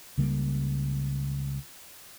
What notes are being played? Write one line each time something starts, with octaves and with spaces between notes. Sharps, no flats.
C#2 C#3 G3 A#3